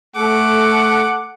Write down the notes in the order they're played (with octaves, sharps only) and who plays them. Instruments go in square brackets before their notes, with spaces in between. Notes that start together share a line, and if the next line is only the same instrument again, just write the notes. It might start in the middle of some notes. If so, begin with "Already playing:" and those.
[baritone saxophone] A3 [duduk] A4 [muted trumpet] F#5 [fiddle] D6